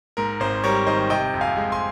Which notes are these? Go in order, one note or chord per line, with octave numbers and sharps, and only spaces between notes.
G#2 A#4
G#1 C5
G3 A#4 C#5
D#3 C5 D#5
C3 D#5 G5
F2
F5 G#5
G#3
G#5 C6